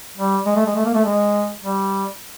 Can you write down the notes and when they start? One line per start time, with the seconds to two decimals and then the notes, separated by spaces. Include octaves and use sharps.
0.17 G3
0.46 G#3
0.56 A3
0.66 G#3
0.76 A3
0.85 A#3
0.95 A3
1.05 G#3
1.64 G3